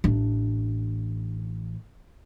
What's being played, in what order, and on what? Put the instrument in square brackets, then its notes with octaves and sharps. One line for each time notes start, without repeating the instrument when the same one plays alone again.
[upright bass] A1 D4